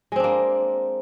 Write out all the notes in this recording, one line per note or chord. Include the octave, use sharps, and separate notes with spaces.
G#3 A#3 C4 D4